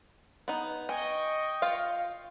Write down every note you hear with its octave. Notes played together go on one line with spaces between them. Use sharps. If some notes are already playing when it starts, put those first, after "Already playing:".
B3 D#4
D#5 G5 G#5 C#6
F4 F5